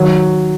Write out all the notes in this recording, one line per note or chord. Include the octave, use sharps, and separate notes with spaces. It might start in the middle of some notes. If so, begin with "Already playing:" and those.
Already playing: D#3 F#3